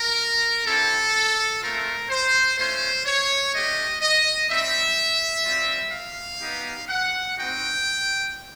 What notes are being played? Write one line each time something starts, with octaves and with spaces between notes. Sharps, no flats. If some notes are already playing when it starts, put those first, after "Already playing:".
Already playing: A#4
C4 E4 G4 A4
A3 C4 F4 A#4
C5
A3 C#4 F4 C5
C#5
A3 D4 G4 D#5
D#5
G3 C4 D#4 E5
G3 C4 F4
F5
B3 D#4 G4
F#5
C4 D#4 F#4 G5